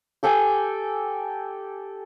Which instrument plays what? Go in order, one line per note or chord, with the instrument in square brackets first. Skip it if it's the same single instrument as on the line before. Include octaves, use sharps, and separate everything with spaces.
[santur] G4 A4 G5 G#5